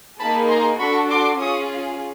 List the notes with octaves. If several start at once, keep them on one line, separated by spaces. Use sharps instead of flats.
A#3 D#4 G#4 A5 B5
A#5 C6
D4 F#4 A4 B5 C#6
C6 D6
C#4 F4 G#4 C#6 D#6